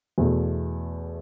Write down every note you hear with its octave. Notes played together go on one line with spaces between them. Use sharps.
E2 B2 A3